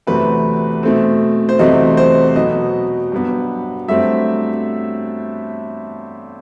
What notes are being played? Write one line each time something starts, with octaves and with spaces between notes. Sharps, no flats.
E2 C3 F#3 A3 C4 B4
B2 A3 C4
C5
E2 C3 F#3 A3 C4 D#5
C5
B2 F#3 B3 D#5
G2 F#3 B3
G2 F#3 A3 C4 E5